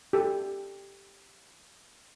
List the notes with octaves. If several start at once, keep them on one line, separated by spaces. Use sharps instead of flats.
G4 A4